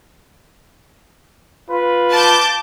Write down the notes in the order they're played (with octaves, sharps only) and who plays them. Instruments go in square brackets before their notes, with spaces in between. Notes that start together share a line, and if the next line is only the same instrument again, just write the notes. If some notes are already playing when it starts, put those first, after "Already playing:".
[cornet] F4 [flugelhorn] B4
[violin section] A5 D6 G6